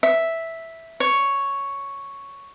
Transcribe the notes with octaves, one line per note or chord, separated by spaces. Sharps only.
E5
C#5